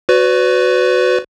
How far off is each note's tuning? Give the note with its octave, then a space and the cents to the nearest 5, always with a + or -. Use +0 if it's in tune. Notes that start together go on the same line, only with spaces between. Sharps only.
F#4 -5 B4 +20 D5 -40